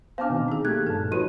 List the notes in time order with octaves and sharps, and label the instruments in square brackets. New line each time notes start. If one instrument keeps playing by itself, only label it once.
[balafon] B3 C4 D4 [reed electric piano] C5 A5 F6 [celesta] F5 D6
[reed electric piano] B2 D#3
[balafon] D#4 G#4
[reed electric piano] A3 A#3 G4 [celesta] F#6 G#6
[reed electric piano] G2 A#2 A5 [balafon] A4
[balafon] F3 F4 [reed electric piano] D#4 B4 C#5 [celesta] F#4 D#7